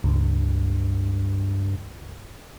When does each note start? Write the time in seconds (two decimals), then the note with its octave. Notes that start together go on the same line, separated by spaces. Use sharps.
0.04 C#2 G2